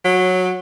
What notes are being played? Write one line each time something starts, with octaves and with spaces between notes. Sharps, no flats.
F#3